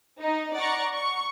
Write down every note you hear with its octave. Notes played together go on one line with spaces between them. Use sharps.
D#4
D5 F#5 A#5 C#6
C#6